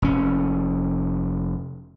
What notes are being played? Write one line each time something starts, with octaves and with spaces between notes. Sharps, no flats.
F1 C#4